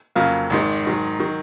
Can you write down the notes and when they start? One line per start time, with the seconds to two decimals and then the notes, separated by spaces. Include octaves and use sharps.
0.15 F2 C#3 F#3 A#3 F4
0.50 G#1 G#2 D#3
0.85 G#2 D#3 F#3
1.19 D#3 F#3